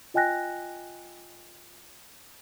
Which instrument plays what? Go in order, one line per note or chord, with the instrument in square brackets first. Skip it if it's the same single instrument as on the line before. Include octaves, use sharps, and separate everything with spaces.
[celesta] F4 D#5 G5 G#5 F#6 A#6